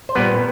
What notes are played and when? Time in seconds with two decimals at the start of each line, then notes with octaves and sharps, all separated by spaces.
0.09 C5
0.15 A#2 G3 B3 B4